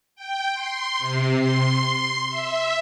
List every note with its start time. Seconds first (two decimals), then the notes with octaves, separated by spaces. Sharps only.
0.16 G5
0.54 C6
0.99 C3
1.39 C6
2.29 E5